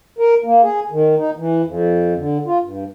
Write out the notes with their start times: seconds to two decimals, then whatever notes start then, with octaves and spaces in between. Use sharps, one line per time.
0.18 A#4
0.44 A#3
0.62 G#4
0.91 D#3
1.17 D#4
1.37 E3
1.65 F2
2.16 D3
2.46 F4
2.61 G2